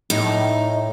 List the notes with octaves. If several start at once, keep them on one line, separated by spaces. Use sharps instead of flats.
A2 D#4